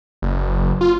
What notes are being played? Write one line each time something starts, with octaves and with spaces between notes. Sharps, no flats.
F#1
F4